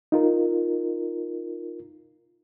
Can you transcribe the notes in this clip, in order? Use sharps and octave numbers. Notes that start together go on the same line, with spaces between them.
D#4 F4 A#4